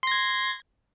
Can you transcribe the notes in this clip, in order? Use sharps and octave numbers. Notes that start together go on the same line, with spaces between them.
C6 G#6 A#6